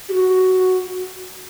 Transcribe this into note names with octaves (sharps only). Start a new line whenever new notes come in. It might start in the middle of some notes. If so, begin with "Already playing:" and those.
G4
F#4